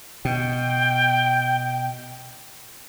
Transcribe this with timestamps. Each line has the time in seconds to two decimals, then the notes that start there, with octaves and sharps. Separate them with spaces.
0.25 B2 G5